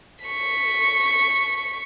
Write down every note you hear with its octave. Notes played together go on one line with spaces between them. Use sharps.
C#6 B6